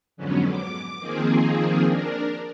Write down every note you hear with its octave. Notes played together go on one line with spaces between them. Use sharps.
F2 G#2 D3 F#3 B3 C#4
D6
D#3 F3 A#3 C4 G#4
D4 A#4